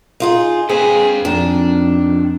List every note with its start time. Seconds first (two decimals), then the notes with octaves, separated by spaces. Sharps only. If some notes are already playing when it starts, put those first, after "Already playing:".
0.20 D#4 F4 G#4
0.69 C4 G#4 B4 F5 G5
1.25 F2 D#3 D4